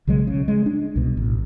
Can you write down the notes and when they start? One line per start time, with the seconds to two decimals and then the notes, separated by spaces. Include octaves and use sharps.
0.07 B1 C#3 F#3 G#3
0.27 C#3
0.48 G#3
0.66 D4
0.96 C2 B2
1.17 A1